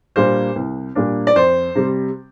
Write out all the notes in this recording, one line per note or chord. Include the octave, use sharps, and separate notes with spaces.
A#2 G3 A#3 D4 C5
C2
A#2 G3 A#3 D4
D5
F2 C5
C3 G3